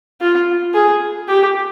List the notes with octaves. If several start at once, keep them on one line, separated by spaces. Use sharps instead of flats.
F4
G#4
G4